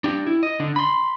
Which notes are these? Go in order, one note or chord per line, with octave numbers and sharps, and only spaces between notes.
D4 G4
E4
D#5
D3 D4
B5 C6